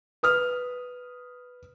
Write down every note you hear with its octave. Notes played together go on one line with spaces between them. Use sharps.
B4 D#6 F6